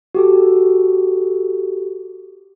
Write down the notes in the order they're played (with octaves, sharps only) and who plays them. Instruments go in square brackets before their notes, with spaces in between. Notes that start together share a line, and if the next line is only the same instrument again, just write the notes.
[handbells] F#4 G4 A4